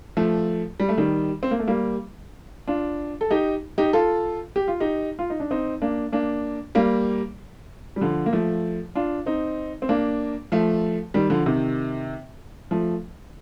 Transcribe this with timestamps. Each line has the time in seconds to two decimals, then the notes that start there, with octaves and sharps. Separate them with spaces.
0.17 F3 A3
0.80 G3
0.89 A3
0.98 D#3 G3
1.43 C4
1.51 A#3
1.59 A3
1.68 G3 A#3
2.67 D4 F4
3.21 A4
3.31 D#4 G4
3.78 D#4 G4
3.93 F4 A4
4.56 G4
4.68 F4
4.80 D#4 G4
5.19 F4
5.30 D#4
5.40 D4
5.51 C4 D#4
5.82 A#3 D4
6.12 A#3 D4
6.75 G3 A#3
7.96 G3
8.01 D3 F3
8.26 A#3
8.33 F3 A3
8.95 D4 F4
9.26 C4 D#4
9.82 C4
9.89 A#3 D4
10.52 F3 A3
11.14 D#3 G3
11.30 D3 F3
11.46 C3 D#3
12.71 F3 A3